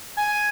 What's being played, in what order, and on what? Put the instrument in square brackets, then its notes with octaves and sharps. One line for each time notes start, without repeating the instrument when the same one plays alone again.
[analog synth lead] G#5